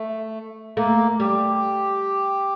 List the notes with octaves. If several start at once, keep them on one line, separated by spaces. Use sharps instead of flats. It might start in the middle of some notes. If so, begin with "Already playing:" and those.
Already playing: A3
A3 A#3
G3 G4